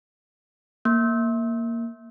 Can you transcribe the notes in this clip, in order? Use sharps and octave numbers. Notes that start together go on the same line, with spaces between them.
A#3